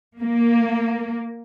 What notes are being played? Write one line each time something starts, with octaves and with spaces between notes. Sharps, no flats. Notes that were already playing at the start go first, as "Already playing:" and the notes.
A#3